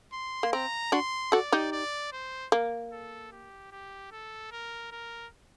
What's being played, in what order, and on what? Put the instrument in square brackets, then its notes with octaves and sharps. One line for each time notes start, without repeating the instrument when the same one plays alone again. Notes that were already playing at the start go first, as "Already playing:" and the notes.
[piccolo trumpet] C6
[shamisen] A#3
[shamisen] C4 [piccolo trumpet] A#5
[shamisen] D4 F#4 [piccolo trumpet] C6
[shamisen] F#4 A4 [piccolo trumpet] D5
[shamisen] D#4 G4
[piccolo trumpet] D5
C5
[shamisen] A#3
[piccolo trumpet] A4
G4
G4
A4
A#4
A#4